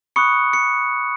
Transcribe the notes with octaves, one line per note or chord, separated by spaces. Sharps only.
B5 C#6 D#6 F#6 C#7
C#7